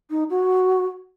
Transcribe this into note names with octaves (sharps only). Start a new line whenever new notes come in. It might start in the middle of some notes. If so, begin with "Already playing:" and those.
D#4
F#4